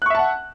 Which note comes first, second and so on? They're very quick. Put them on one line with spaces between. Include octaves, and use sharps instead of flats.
F#6 C#6 E5 A5 F#5